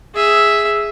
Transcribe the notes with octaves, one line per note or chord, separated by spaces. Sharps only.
G#4 E5